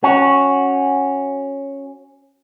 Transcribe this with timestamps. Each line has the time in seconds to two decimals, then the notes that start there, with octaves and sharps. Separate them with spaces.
0.03 C#4 F#4